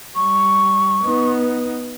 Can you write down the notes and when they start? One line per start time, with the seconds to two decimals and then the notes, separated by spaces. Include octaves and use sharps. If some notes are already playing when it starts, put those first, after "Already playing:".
0.16 G3 C#6
1.03 B3 D#4